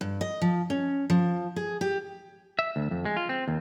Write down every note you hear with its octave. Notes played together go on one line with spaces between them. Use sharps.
G2
D#5
F3
C#4
F3
G#4
G4
E5
D2
F2
G#3
F4
C4
D#2